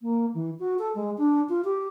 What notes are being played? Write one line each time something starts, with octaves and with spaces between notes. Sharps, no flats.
A#3
E3
F#4
A4
G#3
D4
F4
G4